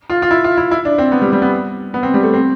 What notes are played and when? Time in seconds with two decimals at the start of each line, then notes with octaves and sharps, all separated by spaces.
0.10 F4
0.22 F4
0.31 E4
0.44 F4
0.57 E4
0.71 E4
0.85 D4
0.98 C4
1.12 B3
1.22 G3
1.33 G3
1.42 B3
1.94 B3
2.03 C4
2.14 G3
2.23 A3
2.34 C4